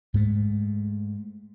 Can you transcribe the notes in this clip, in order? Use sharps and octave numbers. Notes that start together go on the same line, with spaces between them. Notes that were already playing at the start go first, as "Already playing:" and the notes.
G#2 G#3 A3